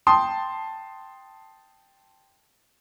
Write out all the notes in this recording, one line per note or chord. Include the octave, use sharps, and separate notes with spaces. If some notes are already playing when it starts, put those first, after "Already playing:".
G5 A5 C6 D#6